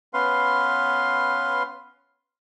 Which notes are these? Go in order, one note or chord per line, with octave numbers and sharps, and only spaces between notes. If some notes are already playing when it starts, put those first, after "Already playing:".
B3 C#4 B4 F5 C6